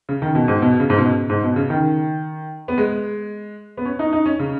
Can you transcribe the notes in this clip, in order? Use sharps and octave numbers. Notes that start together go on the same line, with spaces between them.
C#3
D#3
B2
G#2
B2
C#3
G#2
B2
G#2
B2
C#3
D#3
B3
G#3
B3
C#4
D#4
D#4
C#4
C#3